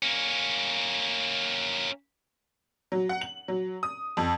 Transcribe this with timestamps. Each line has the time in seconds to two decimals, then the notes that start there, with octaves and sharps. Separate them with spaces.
0.02 A#3 C#4
2.92 F#3
3.09 F#5
3.21 F#7
3.48 F#3
3.83 D#6
4.17 F2